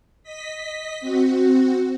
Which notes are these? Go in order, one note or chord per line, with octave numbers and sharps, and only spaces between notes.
D#5 B6
C4 F#4